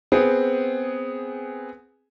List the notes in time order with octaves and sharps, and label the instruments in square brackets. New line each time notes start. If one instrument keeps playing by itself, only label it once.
[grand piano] B3 C4 G#4